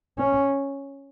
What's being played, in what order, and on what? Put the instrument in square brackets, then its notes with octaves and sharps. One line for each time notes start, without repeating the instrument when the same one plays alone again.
[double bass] C#4